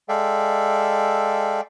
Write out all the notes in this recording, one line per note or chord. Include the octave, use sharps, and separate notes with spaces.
G#3 A4 D5 E5 F5 G5